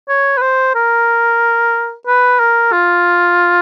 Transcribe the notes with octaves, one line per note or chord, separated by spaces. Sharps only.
C#5
B4
C5
A#4
B4
A#4
F4